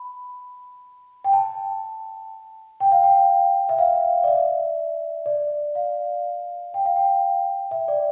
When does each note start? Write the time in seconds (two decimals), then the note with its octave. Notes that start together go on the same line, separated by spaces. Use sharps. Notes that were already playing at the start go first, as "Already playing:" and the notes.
Already playing: B5
1.24 G5
1.33 A5
2.80 G5
2.92 F5
3.03 G5
3.69 E5
3.78 F5
4.24 D5
4.28 E5
5.26 D5
5.75 F5
6.74 G5
6.86 F5
6.96 G5
7.71 E5
7.88 D5